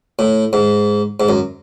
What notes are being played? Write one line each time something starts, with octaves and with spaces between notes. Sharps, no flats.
A2
G#2
G#2
F#2